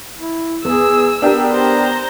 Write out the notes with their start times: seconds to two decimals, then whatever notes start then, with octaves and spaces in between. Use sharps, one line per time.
0.18 E4
0.65 E2 G#4 E6
1.22 B3 D4 G4 A#4
1.52 C5 A#5